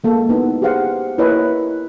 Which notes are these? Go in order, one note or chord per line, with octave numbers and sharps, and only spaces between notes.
G#3 A#3 A4
B3 D#4 E4
G4 G#4 B4 C5 F5 F#5
A#3 E4 A#4 B4 C#5 D#5